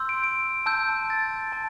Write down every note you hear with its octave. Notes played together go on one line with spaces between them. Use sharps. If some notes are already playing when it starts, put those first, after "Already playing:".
Already playing: C6 E6 G6
D7
D7
A5 E6 G6
A6
A5